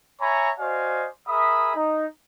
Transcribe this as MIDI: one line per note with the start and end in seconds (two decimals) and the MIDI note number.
0.21 0.50 73
0.21 0.50 76
0.21 0.50 80
0.21 0.50 82
0.21 0.50 83
0.21 0.50 85
0.59 1.08 66
0.59 1.08 72
0.59 1.08 74
0.59 1.08 75
0.59 1.08 77
0.59 1.08 80
1.28 1.74 68
1.28 1.74 70
1.28 1.74 76
1.28 1.74 83
1.28 1.74 87
1.75 2.06 63